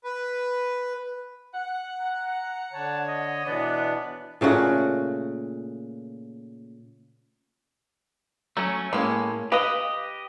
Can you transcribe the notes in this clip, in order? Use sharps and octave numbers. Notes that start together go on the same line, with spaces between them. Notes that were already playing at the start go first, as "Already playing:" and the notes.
B4
F#5
A#5
D3 C#5 A5
D#5
B2 E3 B3 D4 C#5 D5
A#2 C#3 A3 F#4
F#3 A3 C#4
A2 G#3 A#3 C#4
G4 B4 D#5 F5